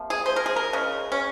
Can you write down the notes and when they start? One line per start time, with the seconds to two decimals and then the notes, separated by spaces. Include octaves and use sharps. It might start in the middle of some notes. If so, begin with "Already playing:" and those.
Already playing: C3 F3 A#3
0.10 G#4
0.26 C5
0.36 A#4
0.46 G#4
0.56 A#4
0.73 C#3 G#3
1.12 C#4